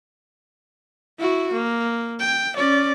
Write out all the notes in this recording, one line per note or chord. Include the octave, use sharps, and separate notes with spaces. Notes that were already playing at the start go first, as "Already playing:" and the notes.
E4 F#4
A#3
G5
C#4 D5